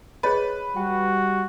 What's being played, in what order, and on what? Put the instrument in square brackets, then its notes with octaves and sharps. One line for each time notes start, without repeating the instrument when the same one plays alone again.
[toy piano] G#4 C#5 D#5 [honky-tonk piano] B4
[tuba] G3 [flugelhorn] F#4 [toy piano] G5